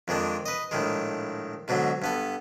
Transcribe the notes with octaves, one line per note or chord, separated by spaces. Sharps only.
F2 D#3 G#3 D4
B4 D#5
A#1 A2 D#3 G#3
G#2 B2 D3 F#3
G2 B3 A4